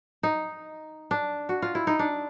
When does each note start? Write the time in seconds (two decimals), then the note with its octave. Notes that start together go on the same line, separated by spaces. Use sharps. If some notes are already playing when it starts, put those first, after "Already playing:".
0.23 D#4
1.11 D4
1.49 F#4
1.62 F4
1.75 E4
1.87 D#4
1.99 D4